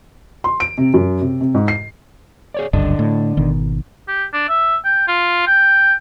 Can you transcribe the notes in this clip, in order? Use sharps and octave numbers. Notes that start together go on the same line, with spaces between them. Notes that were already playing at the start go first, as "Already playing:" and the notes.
C6
D7
C3
F#2
C3
C3
G#2
C7
G#4 C#5 D5
F#1 C#2 G2 D3 D4 D#5
A2
G#1 B2 D#3
G4
D4
E5
G5
F4
G5